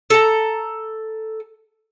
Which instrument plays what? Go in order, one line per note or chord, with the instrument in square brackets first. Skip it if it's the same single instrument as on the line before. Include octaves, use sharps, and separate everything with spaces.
[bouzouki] A4 A#5